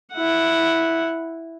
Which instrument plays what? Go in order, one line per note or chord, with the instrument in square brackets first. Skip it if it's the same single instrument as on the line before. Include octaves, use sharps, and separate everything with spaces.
[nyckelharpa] E4 F#5